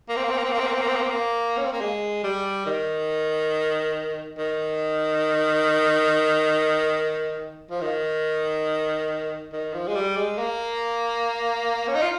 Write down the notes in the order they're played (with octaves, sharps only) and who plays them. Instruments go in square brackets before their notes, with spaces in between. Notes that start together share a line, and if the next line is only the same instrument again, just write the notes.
[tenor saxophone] A#3
C4
A#3
C4
A#3
C4
A#3
C4
A#3
C4
A#3
C4
A#3
C4
A#3
C#4
C4
A#3
G#3
G3
D#3
D#3
F3
D#3
D#3
F3
G#3
G3
G#3
A#3
C#4
D#4
F4